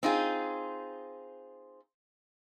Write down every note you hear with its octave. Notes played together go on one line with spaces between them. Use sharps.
C4 D#4 F4 G#4